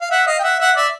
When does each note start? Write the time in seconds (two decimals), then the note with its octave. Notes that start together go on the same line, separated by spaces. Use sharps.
0.01 F5
0.11 E5 F#5
0.27 D#5 F5
0.39 G5
0.44 E5 F#5
0.60 E5 F#5
0.77 D5 E5